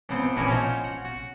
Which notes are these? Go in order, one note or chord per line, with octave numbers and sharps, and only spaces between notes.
C#2 G#2 B3 C4 C5 C6
A#1 E3 C#4 E4 F#4 G#5
C#4 D#4 F4 F#4 C5 C#5
F#5
F#4